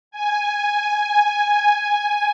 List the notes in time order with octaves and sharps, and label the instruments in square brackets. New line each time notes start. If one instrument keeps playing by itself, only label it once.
[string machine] G#5